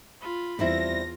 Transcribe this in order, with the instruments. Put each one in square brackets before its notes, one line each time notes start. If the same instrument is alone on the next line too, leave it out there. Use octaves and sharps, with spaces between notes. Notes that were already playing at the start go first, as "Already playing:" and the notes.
[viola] F4 B5
[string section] E2 A#6 [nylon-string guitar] G3 C4 E4 [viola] F4